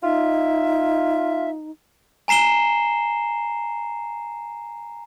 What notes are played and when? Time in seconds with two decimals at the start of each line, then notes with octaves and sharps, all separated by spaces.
0.03 D#4 F4 E5
2.28 G#5 A#5 C7 E7 G7